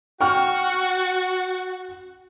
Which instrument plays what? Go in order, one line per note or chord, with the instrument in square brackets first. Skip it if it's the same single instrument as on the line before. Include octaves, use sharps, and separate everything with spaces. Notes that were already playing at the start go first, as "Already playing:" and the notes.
[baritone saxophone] F#4 [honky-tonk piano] G5 C#6 F6